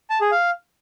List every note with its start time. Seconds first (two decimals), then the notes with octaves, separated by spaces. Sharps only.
0.10 A5
0.21 G#4
0.32 F5